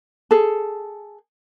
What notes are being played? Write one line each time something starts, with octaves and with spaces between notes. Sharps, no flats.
G#4 A4